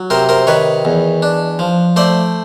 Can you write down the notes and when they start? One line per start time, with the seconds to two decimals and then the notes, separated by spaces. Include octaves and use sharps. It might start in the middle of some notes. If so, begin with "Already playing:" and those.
Already playing: F#3
0.10 C3 A#4 C5
0.29 A#4 C5
0.47 D#3 B4 C#5
0.85 E2
1.22 D4
1.59 F3
1.96 A3 C5 D5